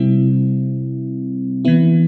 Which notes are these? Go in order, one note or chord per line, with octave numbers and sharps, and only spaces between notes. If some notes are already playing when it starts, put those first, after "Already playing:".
Already playing: C3 G3 C4 E4
E3 B3 E4